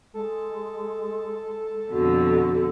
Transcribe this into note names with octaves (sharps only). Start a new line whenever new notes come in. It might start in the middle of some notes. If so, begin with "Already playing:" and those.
G#3 A4
F2 B2 D3 F#4